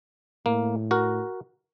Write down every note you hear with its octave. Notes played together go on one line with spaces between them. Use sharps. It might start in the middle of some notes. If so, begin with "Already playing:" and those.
A2 A#3
F#4 A#4